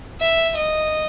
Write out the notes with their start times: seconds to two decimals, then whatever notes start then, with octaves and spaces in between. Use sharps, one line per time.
0.20 E5
0.56 D#5